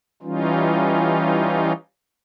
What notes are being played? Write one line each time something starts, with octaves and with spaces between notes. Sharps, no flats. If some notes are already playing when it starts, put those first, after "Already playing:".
E3 G3 C#4 D#4 F4